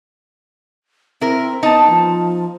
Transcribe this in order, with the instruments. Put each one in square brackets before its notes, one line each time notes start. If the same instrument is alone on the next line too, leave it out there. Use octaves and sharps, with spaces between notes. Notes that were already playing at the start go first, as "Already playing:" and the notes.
[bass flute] C4 [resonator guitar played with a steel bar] E4 A#4
[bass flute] B3 [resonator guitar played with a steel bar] D#4 A5
[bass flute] F3